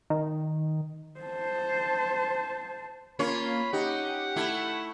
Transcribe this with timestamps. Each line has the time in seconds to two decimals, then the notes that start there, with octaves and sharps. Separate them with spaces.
0.10 D#3
1.20 C5 A5
3.19 A#3 C#4 F4 C#5 B5
3.73 D#4 G4 F#5
4.36 A3 E4